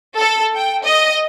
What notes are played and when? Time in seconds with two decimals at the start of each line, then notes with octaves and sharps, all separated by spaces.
0.18 A4
0.55 G5
0.84 D#5